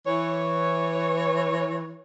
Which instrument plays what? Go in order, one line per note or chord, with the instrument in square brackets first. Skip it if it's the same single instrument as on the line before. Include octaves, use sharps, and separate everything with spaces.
[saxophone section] E3 C#5